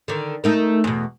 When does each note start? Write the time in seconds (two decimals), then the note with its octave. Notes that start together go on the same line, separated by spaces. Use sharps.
0.08 D3 D#3
0.44 A3 D#4 A#4
0.84 E2 B2